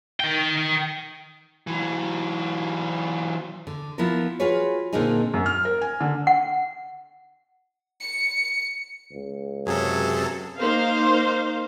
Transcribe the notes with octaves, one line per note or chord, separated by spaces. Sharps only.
D#3 G5
E3 F#3
D3
F3 B3 E4 F4 A#4
F4 F#4 G#4 B4 C#5
A#2 D3 A#3 C4 D#4 G#4
F#2
F6
A#4
G#5
D3
F#5
C#7
C#2
F#2 C3 F#3 G#4 A4
A#3 D#4 C5 F5